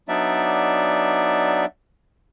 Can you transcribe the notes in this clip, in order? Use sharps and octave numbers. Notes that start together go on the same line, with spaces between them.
F#3 B3 D4 D#4 D5 E5